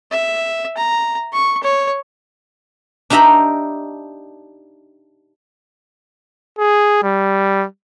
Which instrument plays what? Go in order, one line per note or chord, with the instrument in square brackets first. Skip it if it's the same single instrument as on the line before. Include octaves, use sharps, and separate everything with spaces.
[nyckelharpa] E5
A#5
C#6
C#5
[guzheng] D4 D#4 G4 E5 A#5 B5
[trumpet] G#4
G3